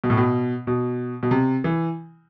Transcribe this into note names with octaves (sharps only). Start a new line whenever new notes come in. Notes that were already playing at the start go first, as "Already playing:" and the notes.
B2
A2
B2
B2
B2
C3
E3